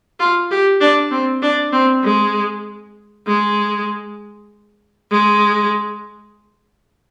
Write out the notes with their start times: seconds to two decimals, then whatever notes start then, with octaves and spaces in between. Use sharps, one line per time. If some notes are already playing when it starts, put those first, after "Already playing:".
0.19 F4
0.51 G4
0.81 D4
1.11 C4
1.42 D4
1.73 C4
2.04 G#3
3.27 G#3
5.11 G#3